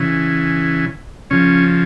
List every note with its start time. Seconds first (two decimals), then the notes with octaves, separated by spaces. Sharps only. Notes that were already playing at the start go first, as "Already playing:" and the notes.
Already playing: C#3 E3
1.30 C#3 F3 C#4